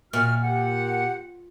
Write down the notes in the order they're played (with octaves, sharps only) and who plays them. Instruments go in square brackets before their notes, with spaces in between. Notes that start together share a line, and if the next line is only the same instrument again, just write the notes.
[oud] A#2 [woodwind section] F#4 E5 F6
[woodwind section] G4 F#5